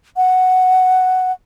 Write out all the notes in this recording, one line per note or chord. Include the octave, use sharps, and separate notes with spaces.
F#5